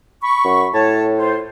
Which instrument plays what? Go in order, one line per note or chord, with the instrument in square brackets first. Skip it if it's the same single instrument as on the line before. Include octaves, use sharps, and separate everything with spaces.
[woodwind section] B5 C#6
[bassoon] F#2
[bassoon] A2 [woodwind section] C#5 A5
[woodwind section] F4 C5